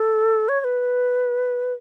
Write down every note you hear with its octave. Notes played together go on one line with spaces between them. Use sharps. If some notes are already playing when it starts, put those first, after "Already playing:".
Already playing: A4
C#5
C#5
B4